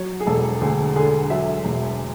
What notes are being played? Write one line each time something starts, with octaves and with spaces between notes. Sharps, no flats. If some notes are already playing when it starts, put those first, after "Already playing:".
Already playing: F#3 C#5
G#4
E1 A4
D2 G#4
D3 G#4
F#3 E5
E1